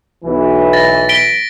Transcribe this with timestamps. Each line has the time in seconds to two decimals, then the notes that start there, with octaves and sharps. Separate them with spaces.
0.24 B1 E3
0.73 A6 A#6
1.09 B6 D7 G7